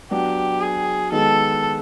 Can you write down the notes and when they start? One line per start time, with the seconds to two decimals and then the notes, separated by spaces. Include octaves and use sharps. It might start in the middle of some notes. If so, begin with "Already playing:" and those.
0.11 F#3 B3 D4 G4
0.61 G#4
1.12 D#3 G#3 B3 A4